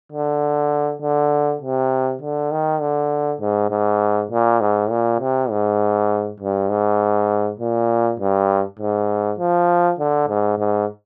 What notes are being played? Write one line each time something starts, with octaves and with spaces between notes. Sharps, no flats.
D3
D3
C3
D3
D#3
D3
G#2
G#2
A#2
G#2
A#2
C3
G#2
G2
G#2
A#2
G2
G#2
F3
D3
G#2
G#2